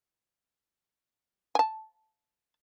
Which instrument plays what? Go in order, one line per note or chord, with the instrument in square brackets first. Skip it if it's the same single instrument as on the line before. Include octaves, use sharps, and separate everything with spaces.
[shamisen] G#5 A5